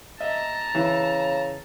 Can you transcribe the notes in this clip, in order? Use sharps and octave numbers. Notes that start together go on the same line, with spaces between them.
D#5 E5 A5 A#5
C#3 E3 E4